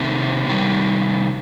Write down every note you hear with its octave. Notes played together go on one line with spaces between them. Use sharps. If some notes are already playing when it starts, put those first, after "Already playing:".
Already playing: C3 D#3 A3 C4
C3 D#3 G3